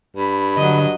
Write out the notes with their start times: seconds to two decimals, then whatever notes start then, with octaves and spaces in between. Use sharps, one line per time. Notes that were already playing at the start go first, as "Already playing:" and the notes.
0.16 G2 B5
0.57 D3 F#3 D#5